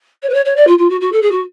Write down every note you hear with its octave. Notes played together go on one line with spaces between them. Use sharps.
C#5
B4
C#5
C#5
D5
F4
F4
F#4
F#4
A4
G#4
F#4